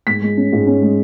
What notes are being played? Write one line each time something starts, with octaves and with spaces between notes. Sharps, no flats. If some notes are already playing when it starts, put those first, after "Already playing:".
G#2 B6
G#3
C#4
G#2
C#4
G#3